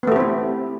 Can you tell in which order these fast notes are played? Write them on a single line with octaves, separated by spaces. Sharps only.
B3 A3 G4 C4 E4